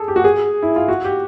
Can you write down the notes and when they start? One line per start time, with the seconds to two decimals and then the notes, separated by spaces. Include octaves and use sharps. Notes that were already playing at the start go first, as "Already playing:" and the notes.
Already playing: G#4 A4
0.08 G4
0.16 F#4
0.24 G#4
0.63 E4
0.76 F4
0.88 F#4
1.04 G4